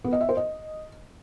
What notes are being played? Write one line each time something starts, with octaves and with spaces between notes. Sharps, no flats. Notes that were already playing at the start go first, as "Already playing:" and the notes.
B3
D#5
E5
C5
D#5